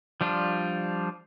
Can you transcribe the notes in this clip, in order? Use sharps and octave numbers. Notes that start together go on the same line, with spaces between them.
F3 G3 D4 F4